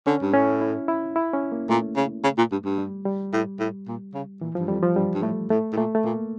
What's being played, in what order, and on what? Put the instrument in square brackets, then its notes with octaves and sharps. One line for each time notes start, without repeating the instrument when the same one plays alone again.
[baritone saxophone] D3 [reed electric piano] C#4
[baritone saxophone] G2
[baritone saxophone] A2 [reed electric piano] C#4
[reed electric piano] E4
E4
E4
C#4
A#3
[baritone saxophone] A#2 [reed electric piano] A3
[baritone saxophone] C#3
C#3
A#2
G2
G2
[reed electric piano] G3
G3
[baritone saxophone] A2
A2
A#2
C#3
[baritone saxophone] A#2 [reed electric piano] E3
[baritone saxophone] G2 [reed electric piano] F3
[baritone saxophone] F2 [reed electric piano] G3
[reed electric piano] F3
[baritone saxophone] G2 [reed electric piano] G3
[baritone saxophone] G2
[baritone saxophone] A2 [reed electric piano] A3
[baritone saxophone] A2 [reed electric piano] A3
[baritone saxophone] A2
[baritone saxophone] A#2 [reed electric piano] A3
[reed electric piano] A3
[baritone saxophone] A#2 [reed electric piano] A#3